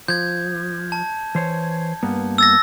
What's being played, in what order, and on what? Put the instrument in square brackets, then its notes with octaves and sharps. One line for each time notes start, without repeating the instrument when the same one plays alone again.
[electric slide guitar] F3 [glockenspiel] G6 G#6
[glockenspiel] A5
[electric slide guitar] E3 C5 C#5
G2 A#3 B3
[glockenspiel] E6 A6 A#6